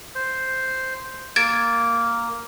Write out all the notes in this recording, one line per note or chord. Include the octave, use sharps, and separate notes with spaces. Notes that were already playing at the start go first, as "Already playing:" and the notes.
C5
A#3 G#6 A6 D7